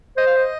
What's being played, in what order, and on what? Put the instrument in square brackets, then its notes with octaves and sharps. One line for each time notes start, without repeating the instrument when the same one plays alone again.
[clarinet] C5 [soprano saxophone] D#5
[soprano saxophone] F5
D#5